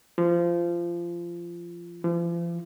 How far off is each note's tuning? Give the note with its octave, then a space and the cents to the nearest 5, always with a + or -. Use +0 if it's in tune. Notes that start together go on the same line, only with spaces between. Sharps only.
F3 -20
F3 -40